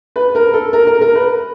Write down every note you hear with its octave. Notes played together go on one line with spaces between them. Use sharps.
B4
A#4
A4
A#4
A#4
A#4
B4